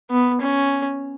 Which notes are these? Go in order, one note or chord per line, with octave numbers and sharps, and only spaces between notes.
B3
C#4